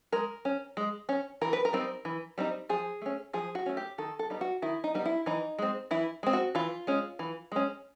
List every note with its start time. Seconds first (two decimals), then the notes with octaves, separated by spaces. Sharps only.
0.12 G#3 A#4
0.45 C#4
0.77 G#3
1.09 C#4
1.41 E3 A#4
1.53 B4
1.65 A#4
1.73 G3 C4 D#4
2.05 E3
2.38 G3 C4 D#4
2.69 F3 G#4
3.01 A3 C#4
3.33 F3 G#4
3.55 F#4
3.66 A3 C#4
3.77 G4
3.98 D#3 A4
4.19 A4
4.30 G3 B3 D#4
4.41 F#4
4.62 D#3 E4
4.84 D#4
4.95 G3 B3 D#4
5.05 E4
5.26 E3 D#4
5.59 G#3 C4
5.91 E3 E4
6.23 G#3 C4
6.33 F#4
6.55 E3 F4
6.87 G#3 C#4
7.19 E3
7.52 G#3 C#4